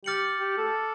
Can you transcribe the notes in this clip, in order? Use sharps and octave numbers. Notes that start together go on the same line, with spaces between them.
G4 D6 F6 A6 C#7 F#7
G4
A4